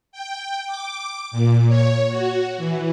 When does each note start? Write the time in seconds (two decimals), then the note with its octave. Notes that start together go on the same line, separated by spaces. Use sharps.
0.12 G5
0.67 D6
1.31 A#2
1.68 C#5
2.09 F#4
2.57 E3